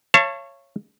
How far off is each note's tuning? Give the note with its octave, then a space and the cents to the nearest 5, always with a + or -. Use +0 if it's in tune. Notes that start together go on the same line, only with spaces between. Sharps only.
C#5 -10 F5 -45 A5 +20